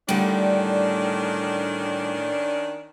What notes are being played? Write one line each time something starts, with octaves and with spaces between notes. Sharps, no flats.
A2 D3 D#3 G3 A3 C#4 D4